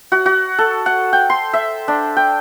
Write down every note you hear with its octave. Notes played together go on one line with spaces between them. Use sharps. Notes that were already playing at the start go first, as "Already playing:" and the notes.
F#4
F#4
A4
F#5
G5
C6
E5
D4
G5